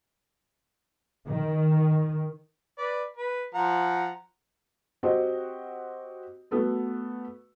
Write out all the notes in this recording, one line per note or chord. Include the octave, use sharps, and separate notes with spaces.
D#3
B4 D5
B4
F3 F#5 A#5
C4 F#4 G4 C5 D#5
A3 B3 F#4 A4 B4